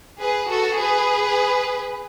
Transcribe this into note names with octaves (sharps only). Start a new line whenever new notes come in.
G#4 B4
F#4 A4
G#4 B4